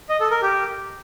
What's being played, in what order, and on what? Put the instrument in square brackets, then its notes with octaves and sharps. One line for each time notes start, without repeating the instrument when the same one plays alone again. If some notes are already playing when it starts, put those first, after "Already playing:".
[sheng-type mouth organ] D#5
A4
A#4
G4